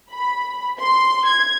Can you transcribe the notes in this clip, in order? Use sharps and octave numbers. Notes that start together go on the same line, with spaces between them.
B5
C6
G#6